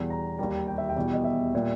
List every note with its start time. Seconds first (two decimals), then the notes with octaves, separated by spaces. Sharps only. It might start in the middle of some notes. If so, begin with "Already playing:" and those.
Already playing: E2 B2 G3
0.10 A#5
0.39 D#2 D#3 G3
0.67 G5
0.78 E5
0.89 G5
0.96 E2 B2 G3
1.13 D#5
1.24 E5
1.55 A#2 G3